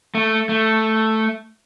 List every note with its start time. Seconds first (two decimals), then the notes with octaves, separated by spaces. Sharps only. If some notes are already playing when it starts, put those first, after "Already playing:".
0.15 A3
0.49 A3